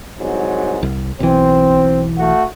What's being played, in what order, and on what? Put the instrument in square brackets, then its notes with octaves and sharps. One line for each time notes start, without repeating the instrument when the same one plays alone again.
[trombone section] C2 G#2 F#3
[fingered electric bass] C2
[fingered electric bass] B1 E3 [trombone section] C4
[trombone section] A3 F#4